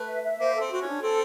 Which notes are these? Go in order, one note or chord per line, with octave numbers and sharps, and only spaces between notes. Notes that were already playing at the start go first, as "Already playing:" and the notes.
Already playing: A3 B4
E5
E5
A#3 C5
A4
C4
C4 F#4
C#4
D4
C4 A4